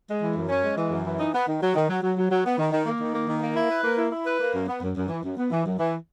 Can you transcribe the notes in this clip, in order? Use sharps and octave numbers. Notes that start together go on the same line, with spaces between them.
G#3
E3
F#2
C#4
G#3
E3
F#2
E3
D#4
B3
D#3
F#3
D#3
F#3
F#3
F#3
F#3
B3
D#3
D#3
A#3
D#3
A#3
D#3
A#3
E4
B4
A#3
E4
E4
B4
A#3
F#2
B3
F#2
F#2
E3
F#2
B3
E3
F#2
E3